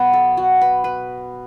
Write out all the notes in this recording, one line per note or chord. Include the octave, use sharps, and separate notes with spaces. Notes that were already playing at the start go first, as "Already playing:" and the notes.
Already playing: B2 F#3 B3 B4
A4
F#4
B4
B4